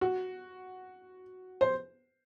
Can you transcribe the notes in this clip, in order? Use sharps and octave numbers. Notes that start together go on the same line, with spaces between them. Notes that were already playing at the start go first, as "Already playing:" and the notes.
F#4
C5